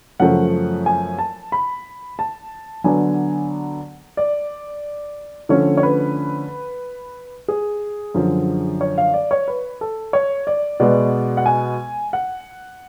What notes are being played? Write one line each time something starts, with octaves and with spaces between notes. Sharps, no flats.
F#2 C#3 F3 A3 F#5
G#5
A5
B5
A5
D3 F#3 B3 D4 G#5
D5
D3 F3 A3 C#4 C#5
C#5
B4
G#4
F#2 D3 F3
C#5
F5
D5
C#5
B4
A4
C#5
D5
B2 G#3 B3 D5
F#5
G#5
F#5